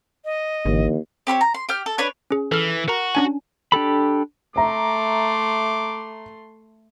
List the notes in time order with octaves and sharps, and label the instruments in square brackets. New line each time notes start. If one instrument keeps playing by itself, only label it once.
[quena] D#5
[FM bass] G#1 [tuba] D#2 [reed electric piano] D3 E3
[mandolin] C4 G4 C5 C#5
A#5
C6
G4 G5 F6
A4
D4 B4 C#5
[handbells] C#4 G#4
[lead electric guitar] E3 [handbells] A4 F6
[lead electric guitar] F#4 [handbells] A#4 A#5
[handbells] C#4 D4 G#5
[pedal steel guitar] D4 G4 A4 B5
[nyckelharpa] A3 C6 [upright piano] E5 A#5 [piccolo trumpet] D6